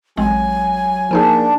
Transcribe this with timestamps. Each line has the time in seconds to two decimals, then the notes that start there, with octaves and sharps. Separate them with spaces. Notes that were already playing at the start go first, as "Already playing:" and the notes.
0.17 A1 F#3 G#3 C4 G#5
1.11 F3 A#3 D4 D#4 G#4